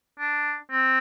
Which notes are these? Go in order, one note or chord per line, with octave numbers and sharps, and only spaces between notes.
D4
C4